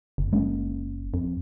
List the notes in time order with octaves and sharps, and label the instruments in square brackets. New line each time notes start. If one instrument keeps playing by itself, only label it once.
[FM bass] F#1
[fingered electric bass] G#3 A#3 C#4
[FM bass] F2